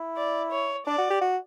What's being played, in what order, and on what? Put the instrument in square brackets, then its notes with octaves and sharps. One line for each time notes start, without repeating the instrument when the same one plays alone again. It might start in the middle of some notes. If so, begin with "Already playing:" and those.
Already playing: [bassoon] E4
[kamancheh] D5
C#5
[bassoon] D4 [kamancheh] D5
[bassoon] F#4
G4
F#4